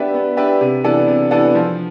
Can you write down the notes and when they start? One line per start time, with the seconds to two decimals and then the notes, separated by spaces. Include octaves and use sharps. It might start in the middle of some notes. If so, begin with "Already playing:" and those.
Already playing: B3 D4 G4 B4 E5
0.14 B3
0.37 D4 G4 B4 E5
0.61 C3
0.84 E3 B3 D4 A4
1.08 C3
1.31 E3 B3 D4 A4
1.55 F3